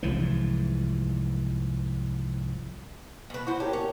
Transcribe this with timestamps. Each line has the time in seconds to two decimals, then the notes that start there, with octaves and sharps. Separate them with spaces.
0.03 C2 G#2 E3 F3
3.30 B2 B4
3.47 E4 F#4 C5
3.60 G4 A#4 C#5 A5
3.73 C#4